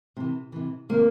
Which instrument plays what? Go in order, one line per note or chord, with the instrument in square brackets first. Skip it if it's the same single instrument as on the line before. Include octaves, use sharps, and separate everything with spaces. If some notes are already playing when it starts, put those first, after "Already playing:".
[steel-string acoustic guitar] C3 E3
C3 E3
C3 D#3 A#3